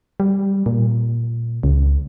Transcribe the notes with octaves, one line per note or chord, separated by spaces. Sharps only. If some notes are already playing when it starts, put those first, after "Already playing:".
G3
A#2
C#2